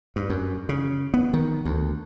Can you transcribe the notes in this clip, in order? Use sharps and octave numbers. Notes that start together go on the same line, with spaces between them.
G2
F#2
C#3
B3
D#3
D2